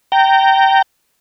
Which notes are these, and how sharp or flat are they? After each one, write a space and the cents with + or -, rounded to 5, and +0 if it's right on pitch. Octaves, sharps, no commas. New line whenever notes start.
G5 -15 A#5 -20